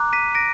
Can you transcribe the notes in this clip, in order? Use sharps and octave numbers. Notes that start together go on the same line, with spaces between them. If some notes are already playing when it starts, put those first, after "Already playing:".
Already playing: A#5 D6 F#6
B6 D#7
A#6 D7